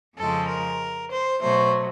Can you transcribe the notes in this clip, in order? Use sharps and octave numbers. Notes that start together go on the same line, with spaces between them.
F2 C#3 F3 G#3 A4
A#4
C5
B2 F#3 A3 C5